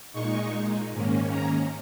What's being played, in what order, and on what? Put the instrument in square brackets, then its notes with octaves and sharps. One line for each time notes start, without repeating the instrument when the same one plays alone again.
[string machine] A#2 G#3 D#4 C#6
G#2 D#3 A#3 C#4
A#5